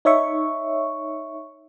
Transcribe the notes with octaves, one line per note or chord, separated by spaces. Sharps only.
D#4 C#5 E5 C#6